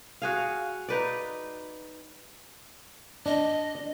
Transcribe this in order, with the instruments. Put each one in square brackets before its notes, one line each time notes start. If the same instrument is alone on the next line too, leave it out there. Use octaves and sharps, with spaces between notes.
[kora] F#4 G#4 F5
D#4 B4 D5
[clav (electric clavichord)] D4 [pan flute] D#5